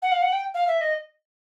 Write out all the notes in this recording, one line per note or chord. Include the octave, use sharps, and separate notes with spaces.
F#5
F5
F#5
G5
F5
E5
D#5